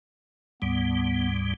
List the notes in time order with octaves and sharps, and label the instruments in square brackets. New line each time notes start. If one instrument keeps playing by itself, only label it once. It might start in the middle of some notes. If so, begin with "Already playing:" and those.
[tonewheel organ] D2 G#2 G3 [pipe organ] B3